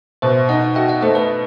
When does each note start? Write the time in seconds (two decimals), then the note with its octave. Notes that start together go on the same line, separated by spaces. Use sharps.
0.22 B2 C5 E5
0.49 D#4 D#5 F#5
0.75 F#4 E5 G5
0.89 D#5 F#5
1.01 A3 C5 E5
1.15 B4 D#5